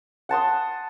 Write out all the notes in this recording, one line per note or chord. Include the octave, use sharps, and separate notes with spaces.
F#5 A5 C6 D#6